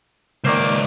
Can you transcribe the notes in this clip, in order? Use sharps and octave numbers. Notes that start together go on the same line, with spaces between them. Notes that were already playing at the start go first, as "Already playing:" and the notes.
C#2 D#3 A#3 C5 D5